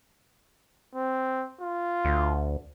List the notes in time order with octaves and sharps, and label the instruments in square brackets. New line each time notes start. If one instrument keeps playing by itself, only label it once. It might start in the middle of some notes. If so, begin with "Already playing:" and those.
[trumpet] C4
F4
[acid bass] D2